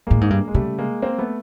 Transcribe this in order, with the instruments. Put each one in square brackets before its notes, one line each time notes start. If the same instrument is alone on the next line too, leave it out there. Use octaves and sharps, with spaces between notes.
[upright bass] A2 [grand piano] G#3 A#3
[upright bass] G#2
G2
[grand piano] G#3
[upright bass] C#3 [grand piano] G3 A3
[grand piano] G#3 A#3
A#3 C4
A3 B3